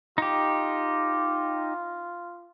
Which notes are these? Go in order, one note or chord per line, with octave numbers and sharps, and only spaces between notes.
D#4 F4 G4